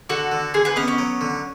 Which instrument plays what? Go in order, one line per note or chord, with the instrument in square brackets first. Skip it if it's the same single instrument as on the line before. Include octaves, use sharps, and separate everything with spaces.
[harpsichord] D3 [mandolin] F#4 A4
[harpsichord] D3
[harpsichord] D3 [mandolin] G#4
[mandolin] G#4 B4
[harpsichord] B3 [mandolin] C#4
[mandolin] C#4
[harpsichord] F#3
D3